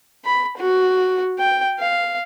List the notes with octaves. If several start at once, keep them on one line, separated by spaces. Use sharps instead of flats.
B5
F#4
G5
F5